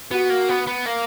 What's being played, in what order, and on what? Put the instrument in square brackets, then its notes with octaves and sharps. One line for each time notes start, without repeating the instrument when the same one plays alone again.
[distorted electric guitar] B3 [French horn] F#4
[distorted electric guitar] A#3
B3
B3
A#3